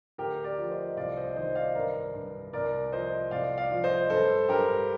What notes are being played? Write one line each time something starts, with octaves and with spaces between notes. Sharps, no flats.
D2 G4 A#4
A#4 D5
F3
C5 D#5
C2 D5 F5
C5 D#5
D#3 C5 D#5
D5 F5
G2 A#4 D5
G2
C2 A#4 D5
F3 C5 D#5
C2 D5 F5
D5 F5
F3
C5 D#5
G2 A4 C5
G2 G4 A#4